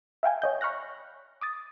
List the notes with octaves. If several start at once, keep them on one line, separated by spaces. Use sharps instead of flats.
E5 F5 G5 G#5
C#5 D#5 G6
B5 C#6 F6 F#6 A#6
D6 D#6 A6